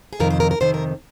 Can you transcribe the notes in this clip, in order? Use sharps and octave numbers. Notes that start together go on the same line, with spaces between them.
G#4
F2 C3 D#3 A#4
C5
A#4
A#4
F2 C3 D#3 C5
A#4